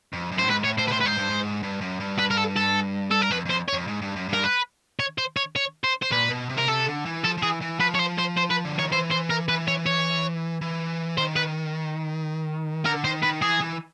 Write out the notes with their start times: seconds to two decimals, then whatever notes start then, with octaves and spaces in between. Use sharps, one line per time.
0.13 F2
0.32 F#2
0.39 A2 C5
0.50 G#2 B4
0.64 A2 C#5
0.78 A2 C5
0.88 B4
0.92 A2 C5
1.01 B4
1.05 G#2 C5
1.18 G2
1.30 G#2
1.63 G2
1.81 F#2
2.00 G2
2.19 B4
2.31 A#4
2.38 A4
2.56 A4
3.11 A4
3.21 A#4
3.31 F2 B4
3.46 F2 C5
3.68 C#5
3.73 F2
3.87 G#2
4.02 G2
4.16 F#2
4.29 G2 A#4
4.44 B4
5.00 C#5
5.18 C5
5.37 C#5
5.56 C#5
5.84 C5
6.02 C5
6.11 A#2 B4
6.30 B2
6.49 C3
6.58 A#4
6.68 C3 A4
6.86 D3
7.05 E3
7.24 F3 A4
7.38 F3
7.43 E3 G#4
7.61 E3
7.80 F3 B4
7.95 C#5
7.99 C5
8.18 C5
8.37 C5
8.50 B4
8.65 D3
8.78 D#3 C#5
8.92 E3 C5
9.11 C5
9.31 A#4
9.49 E3 B4
9.68 C#5
9.86 C#5
10.61 E3
11.18 D#3 C5
11.36 B4
12.85 D3 A#4
13.04 D#3 C5
13.23 D#3 B4
13.42 E3 G#4
13.61 E3